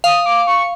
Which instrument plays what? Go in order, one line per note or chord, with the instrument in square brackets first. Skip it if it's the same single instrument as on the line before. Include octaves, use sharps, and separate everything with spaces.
[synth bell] F5 [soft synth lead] D#6
[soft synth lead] D6
C#6